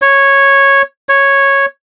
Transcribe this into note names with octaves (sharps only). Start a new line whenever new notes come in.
C#5
C#5